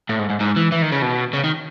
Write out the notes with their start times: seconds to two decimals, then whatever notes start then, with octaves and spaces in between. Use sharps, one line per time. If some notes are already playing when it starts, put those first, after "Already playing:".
0.09 A2
0.19 G#2
0.30 G#2
0.40 G#2
0.56 E3
0.72 E3
0.82 D#3
0.92 C#3
1.02 B2
1.33 C#3
1.44 D#3